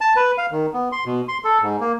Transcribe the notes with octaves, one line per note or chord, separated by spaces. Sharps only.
A5
B4
F5
D#3
B3
C6
B2
C6
A4
G#2
A#3